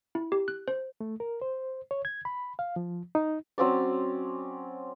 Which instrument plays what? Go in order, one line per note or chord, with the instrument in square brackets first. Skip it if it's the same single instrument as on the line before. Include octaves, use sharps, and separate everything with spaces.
[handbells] E4
G4
F#6
C5
[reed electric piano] A3
A#4
C5
C#5
G#6
B5
F5
F3
D#4
[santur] F#3 C4 C#4 D5